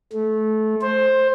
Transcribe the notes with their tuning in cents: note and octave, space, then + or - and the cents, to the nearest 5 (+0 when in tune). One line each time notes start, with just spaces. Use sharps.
A3 -20
C5 +10